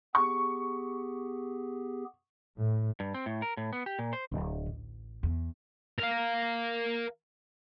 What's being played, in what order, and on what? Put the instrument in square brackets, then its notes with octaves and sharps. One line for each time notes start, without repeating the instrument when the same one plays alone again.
[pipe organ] B3 G4 G#4 [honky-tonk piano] C#6
[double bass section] A2
[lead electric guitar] G2
C4
A2
A#4
A2
B3
G4
A#2
C5
[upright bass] D1
A1
E2
[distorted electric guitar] A#4 F5